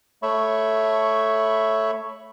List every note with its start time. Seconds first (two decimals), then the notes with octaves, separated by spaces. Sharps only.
0.23 A3 C#5 E5 B5 C#6